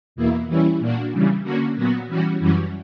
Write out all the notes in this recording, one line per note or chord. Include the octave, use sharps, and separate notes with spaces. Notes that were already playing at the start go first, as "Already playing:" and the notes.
E2 B2 A#3 E4
E3 G3 C#4 E4
A#2 A#3 D4 F#4
C#3 E3 G3
D3 A#3 C#4 F#4
A#2 F#3 B3 F#4
E3 G3 C#4 F#4
F#2 E3 G3 C#4 F#4